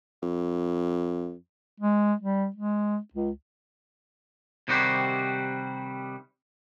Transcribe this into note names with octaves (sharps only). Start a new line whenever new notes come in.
F2
G#3
G3
G#3
C#2
C3 D#3 G3 F#4 G4 C5